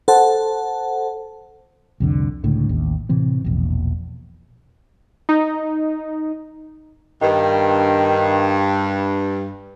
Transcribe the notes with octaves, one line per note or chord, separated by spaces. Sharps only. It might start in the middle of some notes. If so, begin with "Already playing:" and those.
A4 C5 F#5 A5
C2 F2 D3
C#2 A2 D3
A1 D#2
A2 C3 E3 C4
E1 A#1
D#4
G2 D#3